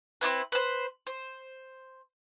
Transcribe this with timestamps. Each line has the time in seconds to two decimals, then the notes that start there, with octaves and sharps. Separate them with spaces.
0.21 C4 D4 E4 B4
0.52 B4 C5
1.07 C5